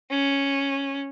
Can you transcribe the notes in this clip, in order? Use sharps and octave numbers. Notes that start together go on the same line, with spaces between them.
C#4